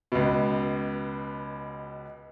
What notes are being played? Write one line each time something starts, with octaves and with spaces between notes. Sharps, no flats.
C#2 B2